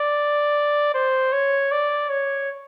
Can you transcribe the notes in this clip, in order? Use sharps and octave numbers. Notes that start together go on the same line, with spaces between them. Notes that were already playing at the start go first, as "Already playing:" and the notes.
Already playing: D5
C5
C#5
D5
C#5